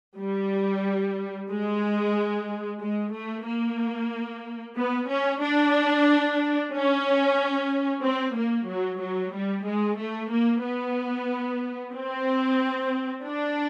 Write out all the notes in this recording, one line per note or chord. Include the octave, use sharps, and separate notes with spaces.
G3
G#3
G#3
A3
A#3
B3
C#4
D4
C#4
C4
A#3
F#3
F#3
G3
G#3
A3
A#3
B3
C4
D4